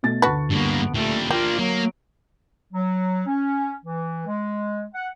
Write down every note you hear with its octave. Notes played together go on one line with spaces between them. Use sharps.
B2 A3 A6
D2 F#4 B4 A5 C#6
G2 A#3 B3
A#2 G3 A3
A#3 D4 F4 G4
F#3 A#3
F#3
C#4
E3
G#3
F#5